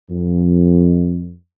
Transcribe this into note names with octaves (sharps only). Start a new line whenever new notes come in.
F2